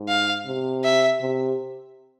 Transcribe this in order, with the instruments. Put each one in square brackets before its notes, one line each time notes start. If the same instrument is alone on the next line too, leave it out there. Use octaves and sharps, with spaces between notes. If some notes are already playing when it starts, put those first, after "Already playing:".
Already playing: [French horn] G#2
[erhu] F5
[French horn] C3
[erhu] E5
[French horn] C3